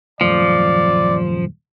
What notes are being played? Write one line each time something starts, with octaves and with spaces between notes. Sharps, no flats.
D#1 F#2 F3 A3 D5